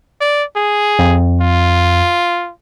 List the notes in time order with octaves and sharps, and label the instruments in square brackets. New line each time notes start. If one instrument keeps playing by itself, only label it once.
[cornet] D5
G#4
[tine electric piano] F2
[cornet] F4